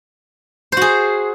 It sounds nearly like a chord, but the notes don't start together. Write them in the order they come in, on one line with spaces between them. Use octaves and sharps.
C5 F#4 G#4